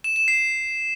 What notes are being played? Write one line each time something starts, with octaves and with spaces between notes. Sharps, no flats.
E7
E7
C7